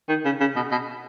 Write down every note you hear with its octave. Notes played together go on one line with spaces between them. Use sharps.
D#3
C#3
C#3
B2
B2